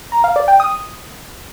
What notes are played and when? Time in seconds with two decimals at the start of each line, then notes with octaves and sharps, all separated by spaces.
0.12 A#5
0.24 F5
0.36 D5
0.48 G5
0.60 D#6